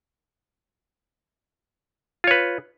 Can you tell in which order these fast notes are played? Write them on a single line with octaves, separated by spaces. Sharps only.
F4 C#5 B4